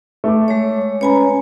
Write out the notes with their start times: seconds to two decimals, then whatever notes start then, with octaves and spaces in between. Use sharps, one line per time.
0.24 A3 D6
0.48 G#3 C#5
1.01 C#4 B4 C#5 G#5 A#5 B5